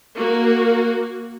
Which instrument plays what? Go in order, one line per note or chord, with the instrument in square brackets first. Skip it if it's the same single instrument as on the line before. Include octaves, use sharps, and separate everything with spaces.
[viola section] A#3 F#4